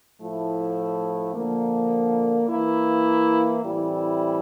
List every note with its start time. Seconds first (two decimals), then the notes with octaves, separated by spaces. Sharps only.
0.20 A2 F3 A3 E4
1.35 D3 F3 A#3
2.49 E3 A#3 E4
3.63 A2 E3 G3 C4 E4